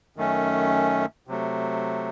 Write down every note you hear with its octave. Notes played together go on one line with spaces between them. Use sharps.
F#2 D#3 A3 C#4
C3 F#3 A3